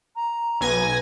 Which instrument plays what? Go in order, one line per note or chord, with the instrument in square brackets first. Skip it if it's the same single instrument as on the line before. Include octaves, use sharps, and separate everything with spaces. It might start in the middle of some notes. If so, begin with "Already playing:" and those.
[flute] A#5
[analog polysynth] B1 G#5 A#6 [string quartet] B4 G#6